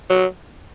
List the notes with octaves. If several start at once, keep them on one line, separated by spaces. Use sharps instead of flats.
F#3